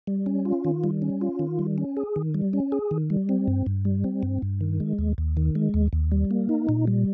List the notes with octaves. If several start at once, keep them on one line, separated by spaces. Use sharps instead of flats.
G3
C#4
F4
D#3
G3
C#4
F4
D#3
G3
C#4
G#4
D#3
G3
C#4
G#4
D#3
G3
C4
G2
G2
G3
C4
G2
G2
D#3
G#3
D#2
D#2
D#3
G#3
D#2
D#2
G3
A#3
D#4
A#2
G3